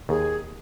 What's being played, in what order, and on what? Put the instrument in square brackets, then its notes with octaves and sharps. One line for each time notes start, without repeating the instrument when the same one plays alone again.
[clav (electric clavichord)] D#2 [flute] G#4